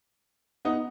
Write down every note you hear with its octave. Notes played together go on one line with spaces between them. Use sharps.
B3 D#4